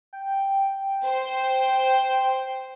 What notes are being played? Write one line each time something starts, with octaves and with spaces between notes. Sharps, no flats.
G5
C5